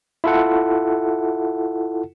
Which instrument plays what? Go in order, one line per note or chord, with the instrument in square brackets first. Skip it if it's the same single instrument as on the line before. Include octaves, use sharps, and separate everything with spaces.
[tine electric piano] E4 F4 A4 F#5